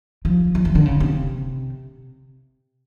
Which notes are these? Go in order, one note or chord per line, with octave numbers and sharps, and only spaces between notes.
F3
F3
E3
D3
C#3
C3